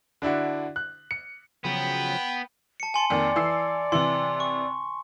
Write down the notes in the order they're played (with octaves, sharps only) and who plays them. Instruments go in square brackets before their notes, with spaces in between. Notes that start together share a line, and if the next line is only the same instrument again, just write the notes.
[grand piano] D3 D4 E4 F#4
F#6
C#7
[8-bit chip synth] C#3 F3 F#3 [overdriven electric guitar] B3 [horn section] G5 B5
[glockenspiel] A5 C#7
[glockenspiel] G#5 C6 C#7 [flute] A5
[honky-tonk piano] F2 D#3 A#3 [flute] D5
[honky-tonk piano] E3 E6 C7
[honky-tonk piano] C3 E3 [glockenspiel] C6
[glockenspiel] C#6